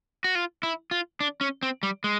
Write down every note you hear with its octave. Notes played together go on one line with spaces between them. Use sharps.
F#4
F4
E4
F4
D4
C#4
C4
G3
G#3